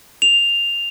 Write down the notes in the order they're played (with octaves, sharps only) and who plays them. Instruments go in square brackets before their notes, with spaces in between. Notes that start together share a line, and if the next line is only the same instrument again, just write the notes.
[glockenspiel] F7